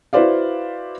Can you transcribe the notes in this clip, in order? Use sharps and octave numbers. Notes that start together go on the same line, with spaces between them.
E4 F#4 B4 C5 D5 F5